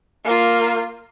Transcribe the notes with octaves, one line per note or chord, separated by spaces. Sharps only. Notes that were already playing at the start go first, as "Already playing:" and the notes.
A#3 F4